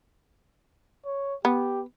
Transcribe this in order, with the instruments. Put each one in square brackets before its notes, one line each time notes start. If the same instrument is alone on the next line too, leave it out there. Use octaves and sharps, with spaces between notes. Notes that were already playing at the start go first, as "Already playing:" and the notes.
[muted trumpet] C#5
[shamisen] B3 [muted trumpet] G4